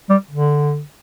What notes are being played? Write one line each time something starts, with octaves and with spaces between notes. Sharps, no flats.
G3
D3